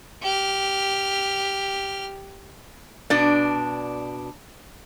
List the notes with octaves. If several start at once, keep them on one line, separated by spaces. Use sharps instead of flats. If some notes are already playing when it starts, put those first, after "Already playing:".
G4 F6
B2 D4 D5